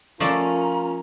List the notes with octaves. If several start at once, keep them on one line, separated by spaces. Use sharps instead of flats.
F3 A3 C#4 F4 A#4 D5 A#5